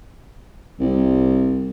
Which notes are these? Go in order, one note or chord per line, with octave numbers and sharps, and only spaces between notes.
C2